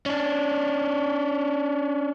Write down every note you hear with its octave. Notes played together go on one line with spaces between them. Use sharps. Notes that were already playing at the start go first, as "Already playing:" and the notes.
C#4 D4